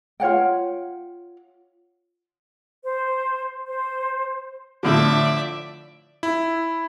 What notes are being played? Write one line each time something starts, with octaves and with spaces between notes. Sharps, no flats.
F4 C#5 F#5 G5
C5
C5
A2 D3 F3 D5 E5
E4